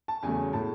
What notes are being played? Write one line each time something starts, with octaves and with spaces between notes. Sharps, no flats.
A5
E2 C#3 F#3 A3 G#5
A2 G#3 A5